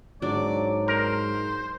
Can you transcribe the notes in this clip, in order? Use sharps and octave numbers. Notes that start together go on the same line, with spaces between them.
G#2 F#3 D4 D5
A#4 C5